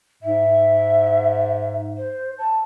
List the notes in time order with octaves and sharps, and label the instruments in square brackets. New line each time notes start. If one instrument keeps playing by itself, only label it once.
[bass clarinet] G#2 [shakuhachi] E5
[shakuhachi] C5
A5